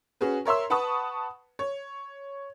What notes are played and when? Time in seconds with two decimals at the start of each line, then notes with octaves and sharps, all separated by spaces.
0.21 C#4 F#4 G#4 B4
0.45 A#4 C#5 E5 C6 E6
0.70 B4 F#5 A5 B5 C#6 D#6
1.59 C#5